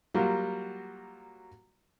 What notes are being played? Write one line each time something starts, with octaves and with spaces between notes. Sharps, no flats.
F#3 G3 A#3 F4 F#4